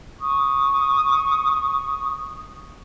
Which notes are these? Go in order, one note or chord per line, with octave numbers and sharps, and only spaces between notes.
C#6 D#6